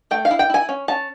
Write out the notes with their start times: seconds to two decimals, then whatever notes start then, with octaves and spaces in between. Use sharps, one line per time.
0.11 A3 G5
0.25 F5
0.31 E4
0.39 G5
0.50 E4 G#5
0.69 C#4
0.88 C#4 A5